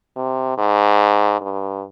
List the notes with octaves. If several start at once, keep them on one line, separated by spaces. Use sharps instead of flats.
C3
G#2
G2